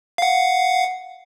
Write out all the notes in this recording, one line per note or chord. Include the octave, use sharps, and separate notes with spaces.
F5 F#5